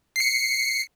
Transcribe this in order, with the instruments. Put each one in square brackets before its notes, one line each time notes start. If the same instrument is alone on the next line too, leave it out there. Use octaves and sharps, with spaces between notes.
[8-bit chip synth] C7 C#7